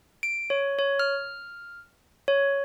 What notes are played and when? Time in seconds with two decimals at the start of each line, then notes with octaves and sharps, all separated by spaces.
0.23 D7
0.50 C#5
0.79 C#5
0.99 F6
2.28 C#5